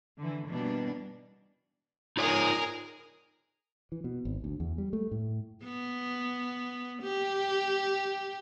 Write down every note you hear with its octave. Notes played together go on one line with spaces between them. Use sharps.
D3 E3
B2 E3 G3 A#3 B3 D4
D#4 F4 G#4 A#4 C#5
E3
B2
G#1
D2
E2
G3
A3
A2
B3
G4